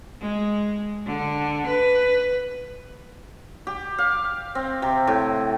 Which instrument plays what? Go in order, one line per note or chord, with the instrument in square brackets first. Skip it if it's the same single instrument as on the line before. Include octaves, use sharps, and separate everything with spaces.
[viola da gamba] G#3
D3
B4
[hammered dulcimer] G4
F5
C4
C3
A2